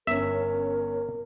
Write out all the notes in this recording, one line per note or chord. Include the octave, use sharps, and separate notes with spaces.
G1 C#4 A#4 E5